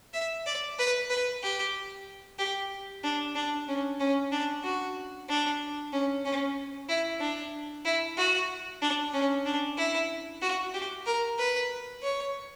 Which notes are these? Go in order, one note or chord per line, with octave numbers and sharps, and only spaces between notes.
E5
D5
B4
B4
G4
G4
D4
D4
C#4
C#4
D4
F#4
D4
C#4
C#4
E4
D4
E4
F#4
D4
C#4
D4
E4
F#4
G4
A#4
B4
C#5